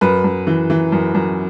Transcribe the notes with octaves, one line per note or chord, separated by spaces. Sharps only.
F#2 B4
F#2
E3
E3
F#2
F#2